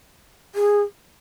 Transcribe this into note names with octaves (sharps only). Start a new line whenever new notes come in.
G#4